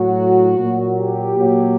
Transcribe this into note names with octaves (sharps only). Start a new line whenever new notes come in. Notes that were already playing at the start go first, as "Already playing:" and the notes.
Already playing: A2 F#3 F#4
A#2 F#3
G4
A#2 F#3